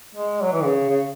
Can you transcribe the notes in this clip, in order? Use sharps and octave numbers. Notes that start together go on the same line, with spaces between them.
G#3
F#3
E3
C#3
C#3